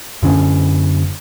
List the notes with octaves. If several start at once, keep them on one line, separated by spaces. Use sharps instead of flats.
F#2 D3 C#4